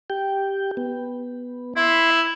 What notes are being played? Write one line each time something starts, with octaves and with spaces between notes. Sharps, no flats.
G4 G5
B3
E4 E5 B5 C6